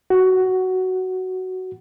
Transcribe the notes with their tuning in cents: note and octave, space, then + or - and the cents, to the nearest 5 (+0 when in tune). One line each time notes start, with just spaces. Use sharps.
F#4 +10